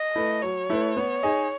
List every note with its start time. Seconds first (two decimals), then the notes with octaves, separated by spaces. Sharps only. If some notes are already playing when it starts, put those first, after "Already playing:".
Already playing: D#5
0.15 A3 E4 B4
0.42 F#3 C#5
0.69 A3 E4 B4
0.96 B3
1.23 D#4 G#4 D#5